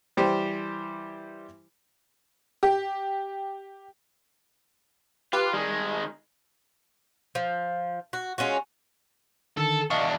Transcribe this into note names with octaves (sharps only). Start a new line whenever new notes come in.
E3 G3 G4 C5
G4
F4 G4 B4
D#3 G3 G#3
F3
F#4
G#3 C#4 F4 F#4
D3 D#3 A4
E2 D4 D#5 F5 C#6